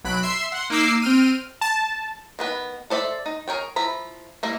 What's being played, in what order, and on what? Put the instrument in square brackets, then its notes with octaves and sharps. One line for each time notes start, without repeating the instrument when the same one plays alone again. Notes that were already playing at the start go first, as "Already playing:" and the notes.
[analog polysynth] B1 F#3 B5 F#6 D7
E5 C6 E6 C7
F#5 C6
A#3 D#4 D6 E6 C7
C4 G5 F6 D#7
[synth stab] A5
[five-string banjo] D#3 B3 B4
A4 C5 D5 E5
D#4
G#4 A#4 C#5 G5
F3 E4 A#5 B5
G3 A#3 E4